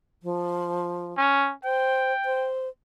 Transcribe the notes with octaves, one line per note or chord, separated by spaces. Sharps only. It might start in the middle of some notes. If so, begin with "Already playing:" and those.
F3
C#4
C5 G5
C5